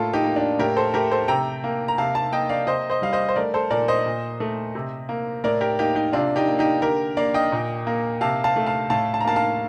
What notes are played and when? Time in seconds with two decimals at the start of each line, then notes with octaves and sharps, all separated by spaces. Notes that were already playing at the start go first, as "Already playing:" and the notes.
Already playing: A2 A#3 F4 A4
0.13 D#4 G4
0.24 A#3
0.36 D4
0.59 A2 G4 A#4
0.77 A4 C5
0.94 A3 G4 A#4
1.11 A4 C5
1.28 C3 G5 A#5
1.64 A#3
1.88 A#5
1.98 C3 F5 A5
2.15 F5 A5
2.32 A#3 D#5 G5
2.49 D5 F5
2.67 C3 C5 D#5
2.90 C5 D#5
3.02 G3 F5
3.13 C5 D#5
3.29 C5
3.36 A3 A#4 D5
3.54 A4 C5
3.70 A#2 A#4 D5
3.88 C5 D#5
4.06 A#2
4.40 A3
4.75 C3
5.09 A#3
5.44 A2 A#4 D5
5.61 G4 A#4
5.79 A#3 D#4 G4
5.95 D#4 G4
6.13 C3 D4 F4
6.36 D#4 G4
6.48 A#3
6.59 D#4 G4
6.82 D3 G4 A#4
7.17 A#3 D5 F5
7.34 D#5 G5
7.52 A#2
7.87 A#3
8.21 C3 F5 A5
8.44 F5 A5
8.56 A3
8.66 F5 A5
8.90 A2 F5 A5
9.14 A5
9.21 A#5
9.25 A#3 F5 A5
9.36 F5 A5